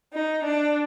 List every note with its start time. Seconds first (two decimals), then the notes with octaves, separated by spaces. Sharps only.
0.13 D#4
0.44 D4